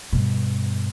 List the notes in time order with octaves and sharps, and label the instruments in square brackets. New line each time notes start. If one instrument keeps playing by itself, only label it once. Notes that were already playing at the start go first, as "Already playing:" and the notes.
[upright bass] G2 B2